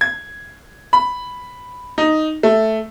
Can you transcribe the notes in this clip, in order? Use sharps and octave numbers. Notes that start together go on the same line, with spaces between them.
G#6
B5
D#4
A3